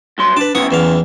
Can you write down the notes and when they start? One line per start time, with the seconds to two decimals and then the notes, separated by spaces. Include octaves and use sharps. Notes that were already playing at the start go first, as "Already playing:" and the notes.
0.18 G2 F#3 C6
0.36 D4 B4 A5
0.55 F#3 B3 C#4 E4 C#6 D#6
0.71 E2 E3 F5